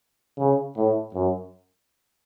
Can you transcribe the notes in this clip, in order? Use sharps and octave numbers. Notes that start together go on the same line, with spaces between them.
C#3
A2
F#2